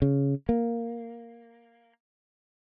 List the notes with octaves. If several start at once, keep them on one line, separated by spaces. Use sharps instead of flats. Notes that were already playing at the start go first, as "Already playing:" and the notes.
C#3
A#3